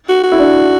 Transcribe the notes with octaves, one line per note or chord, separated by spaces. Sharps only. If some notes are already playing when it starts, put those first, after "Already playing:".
F#4
F#4
E4
D4